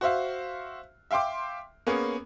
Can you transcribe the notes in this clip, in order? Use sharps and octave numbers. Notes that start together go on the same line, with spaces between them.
F#4 C5 E5 F5
E5 F5 G5 C6 D6
A#3 B3 C#4 G#4